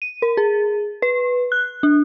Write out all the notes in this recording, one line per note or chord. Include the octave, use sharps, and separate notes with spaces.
D#7
A#4
G#4
B4
F#6
D4